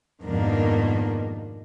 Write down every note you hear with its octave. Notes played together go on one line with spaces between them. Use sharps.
F2 G#2 B2 D#3 A#3 D4